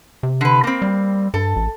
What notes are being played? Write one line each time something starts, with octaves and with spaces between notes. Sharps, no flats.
C3
D3 B4
A#3 C4
G3
G2 A4
A1